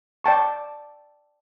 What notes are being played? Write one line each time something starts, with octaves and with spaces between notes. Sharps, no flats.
D5 G5 A5 C#6